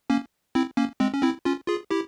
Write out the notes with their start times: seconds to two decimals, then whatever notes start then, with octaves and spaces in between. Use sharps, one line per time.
0.10 A#3 C#4
0.55 C4 E4
0.77 A#3 C#4
1.00 G#3 C4
1.14 C#4
1.22 C4 E4
1.45 C#4 F4
1.68 F4 G#4
1.91 E4 G4